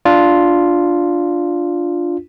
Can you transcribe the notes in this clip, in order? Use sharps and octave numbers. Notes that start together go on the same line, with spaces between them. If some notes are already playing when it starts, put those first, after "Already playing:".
D4 F4